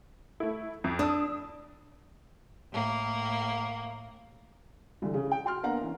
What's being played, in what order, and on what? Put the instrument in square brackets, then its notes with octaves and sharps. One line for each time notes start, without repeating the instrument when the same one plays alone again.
[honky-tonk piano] A3 E4
F2
[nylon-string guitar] D4 [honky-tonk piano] D#6 E6
[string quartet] A2 A#3
[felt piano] C2 D3 E3
C#3 C#4
G5
F#4 G5 C6 F6
A#3 B3 D4 F5 F#5 A#5
E3 C#4